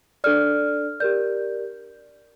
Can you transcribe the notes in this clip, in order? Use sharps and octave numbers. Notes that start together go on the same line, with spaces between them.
D4 A4 D5 F6
G4 A#4 D5 G6